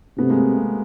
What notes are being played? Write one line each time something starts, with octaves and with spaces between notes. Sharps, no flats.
C3 A3 B3
G#3 A#3